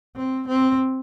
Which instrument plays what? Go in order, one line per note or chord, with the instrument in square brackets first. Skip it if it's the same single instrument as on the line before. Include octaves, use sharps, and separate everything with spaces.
[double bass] C4
C4